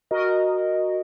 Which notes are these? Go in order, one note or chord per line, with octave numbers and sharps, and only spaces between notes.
F#4 A#4 D#5